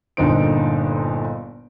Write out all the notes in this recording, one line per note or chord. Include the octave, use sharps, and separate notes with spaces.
G1 A#2 D3 D#4 C5 D7